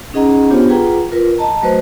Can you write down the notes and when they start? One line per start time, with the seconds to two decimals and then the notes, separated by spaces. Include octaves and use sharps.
0.13 C#4 D#4 G#4 D#5 F#5 A#5
0.50 B3 D4 F4 G4 C5 C#5
0.69 F4 G#4 B4 F#5 G5 A#5
1.12 F4 A#4 B4
1.38 D#5 A5 A#5
1.62 F#3 A3 F#4 B4 C5 D#5